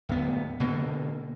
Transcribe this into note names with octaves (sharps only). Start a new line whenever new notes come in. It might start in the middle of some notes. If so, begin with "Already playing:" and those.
D1 B3
B2 D3 A#3